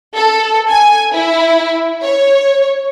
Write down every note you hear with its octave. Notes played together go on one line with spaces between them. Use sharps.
A4
G#5
E4
C#5